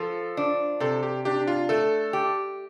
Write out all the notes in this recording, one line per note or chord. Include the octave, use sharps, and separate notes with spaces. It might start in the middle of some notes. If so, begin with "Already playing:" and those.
Already playing: F3 A4
D4
C3 A4
G4
D4 G4
F4
A3 A4
G4